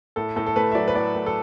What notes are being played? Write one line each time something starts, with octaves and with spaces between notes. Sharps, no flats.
A2 A4
A2 A4
A4
A3 B4
E5
F#3 D5
B4
A2 D5
A2
A4